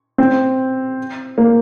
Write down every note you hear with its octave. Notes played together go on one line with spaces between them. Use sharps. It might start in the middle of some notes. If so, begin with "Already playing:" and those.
C4
A#3